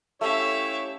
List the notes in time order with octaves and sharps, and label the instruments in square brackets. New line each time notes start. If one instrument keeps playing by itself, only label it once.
[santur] A3 C#4 [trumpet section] E4 G4 C#5 [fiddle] E5 F5